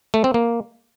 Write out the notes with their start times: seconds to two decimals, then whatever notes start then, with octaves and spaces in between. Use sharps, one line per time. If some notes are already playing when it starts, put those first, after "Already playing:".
0.14 A3
0.24 C4
0.34 A#3